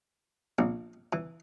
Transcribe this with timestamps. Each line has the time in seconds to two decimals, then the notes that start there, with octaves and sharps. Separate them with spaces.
0.59 A#1
1.13 E3